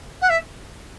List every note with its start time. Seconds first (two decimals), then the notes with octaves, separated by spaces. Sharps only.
0.21 F#5
0.29 E5